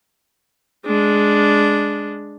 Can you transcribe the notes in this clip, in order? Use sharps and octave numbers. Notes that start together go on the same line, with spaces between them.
G#3 D4